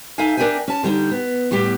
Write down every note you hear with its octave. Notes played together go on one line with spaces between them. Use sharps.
D#4 A4 E5 F5 G#5
D4 A#4 D5 E5 G5 G#5
C#4 A5
D3 G3 C4 D#4
B3
A2 G3 B3 G4